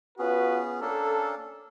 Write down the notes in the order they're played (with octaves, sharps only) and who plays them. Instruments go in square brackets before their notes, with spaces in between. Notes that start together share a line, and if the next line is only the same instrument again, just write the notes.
[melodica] B3 C#4 G#4 [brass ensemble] F4 F#4 B4
[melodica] A#3 C#4 D4 [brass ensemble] A4